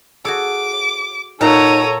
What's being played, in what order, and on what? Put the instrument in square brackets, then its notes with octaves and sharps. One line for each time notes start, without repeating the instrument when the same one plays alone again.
[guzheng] F#4 G#4 A4 [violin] D6
[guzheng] A#2 A#3 F#4 [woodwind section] D#4 [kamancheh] A4 C#5 [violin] A#5 D#7